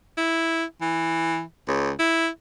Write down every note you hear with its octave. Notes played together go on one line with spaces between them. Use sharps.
E4
E3
C#2
E4